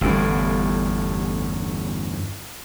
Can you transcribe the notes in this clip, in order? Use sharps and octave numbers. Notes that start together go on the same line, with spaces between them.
G1 E2 A2